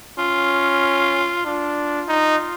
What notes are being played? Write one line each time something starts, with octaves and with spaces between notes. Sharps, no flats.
C#4 F4
D4 F4
D#4